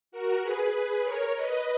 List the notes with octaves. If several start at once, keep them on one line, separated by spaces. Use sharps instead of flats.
F#4 A#4
G#4 B4
G#4 B4
A#4 C#5
B4 D#5